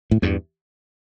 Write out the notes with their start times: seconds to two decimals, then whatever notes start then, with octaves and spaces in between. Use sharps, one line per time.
0.11 A2
0.22 E2 G2